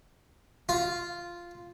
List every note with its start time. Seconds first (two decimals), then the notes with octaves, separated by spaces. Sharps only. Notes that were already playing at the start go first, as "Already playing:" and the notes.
0.69 F4